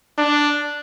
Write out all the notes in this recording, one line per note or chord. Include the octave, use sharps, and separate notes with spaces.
D4